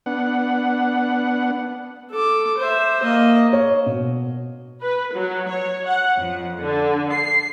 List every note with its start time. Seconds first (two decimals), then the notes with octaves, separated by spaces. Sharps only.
0.06 B3 D4 F#5
2.10 A4 D6
2.58 C5 E5
3.03 A#3 D#5
3.53 C#5
3.86 B2
4.81 B4
5.14 F#3
5.49 C#5
5.86 F#5
6.18 F2
6.62 D3
7.12 C7